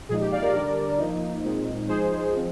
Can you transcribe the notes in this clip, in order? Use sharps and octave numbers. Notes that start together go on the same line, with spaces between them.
A#2 F3 G#3 D#4 G#4
G4
D5 F5
A#4 D5
D3 G3 D4 A#4 D5
F3 A#3 D#4
A#2 G#3 C4 D#4
F3 G#3 D#4 G#4 C5
F3 G#3 C4